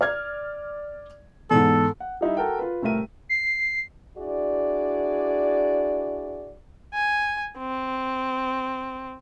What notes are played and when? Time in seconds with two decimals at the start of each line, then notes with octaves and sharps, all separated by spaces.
0.01 D5 F6 G#6
1.50 E2 G#2 A4
2.00 F#5
2.21 G3 D#4 E4 E5
2.37 F#4 A4 A#4 F#5 G5
2.59 F4 B4
2.82 C2 A2 A3 A#4 E5 D#7
3.29 C7
4.17 D4 E4 F#4 G#4 D5
6.94 G#5
7.58 C4